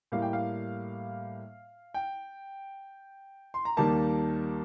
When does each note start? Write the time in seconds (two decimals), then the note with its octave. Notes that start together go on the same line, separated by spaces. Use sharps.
0.12 A2 G3 A#3 F5
0.22 G5
0.33 F5
1.94 G5
3.54 C6
3.65 A#5
3.77 D#2 D#3 G3 A#3 A5